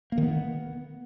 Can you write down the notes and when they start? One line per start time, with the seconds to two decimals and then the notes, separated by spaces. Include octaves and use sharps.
0.12 A#3
0.18 D#3
0.23 B3